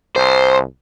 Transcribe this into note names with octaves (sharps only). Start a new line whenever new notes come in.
C2 C5